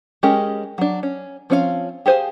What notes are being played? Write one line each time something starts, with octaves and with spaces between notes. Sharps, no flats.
G#3 C#4 G4 A#4 D#5
F#3 D4
C#4
F3 C4 C#4 G#4 F5
G4 G#4 C5 F5 G#5